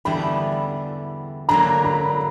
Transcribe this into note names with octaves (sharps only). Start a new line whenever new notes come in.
E2 D3 G3 B3 E4 B5
D3 F#3 A#3 A#5
B5